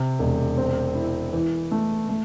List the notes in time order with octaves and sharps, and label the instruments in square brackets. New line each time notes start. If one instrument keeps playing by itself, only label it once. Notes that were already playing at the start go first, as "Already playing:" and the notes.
Already playing: [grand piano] C3
E1
C4
E4
E3
A3
A3